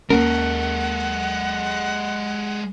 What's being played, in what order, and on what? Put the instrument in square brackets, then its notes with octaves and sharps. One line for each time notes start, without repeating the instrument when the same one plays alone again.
[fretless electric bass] D#2 A#3 C#4 [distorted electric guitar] G#3 A4 [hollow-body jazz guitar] A#4 [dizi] F#5